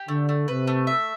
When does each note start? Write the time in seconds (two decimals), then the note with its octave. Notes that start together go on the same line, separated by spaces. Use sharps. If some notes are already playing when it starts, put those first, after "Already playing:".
Already playing: G4
0.08 D3 A3
0.29 A3
0.48 C3 B4
0.67 A3
0.87 E5